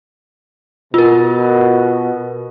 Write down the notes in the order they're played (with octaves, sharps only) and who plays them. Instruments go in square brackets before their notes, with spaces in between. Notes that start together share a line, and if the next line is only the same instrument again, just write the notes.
[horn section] B2 [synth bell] F4 A#4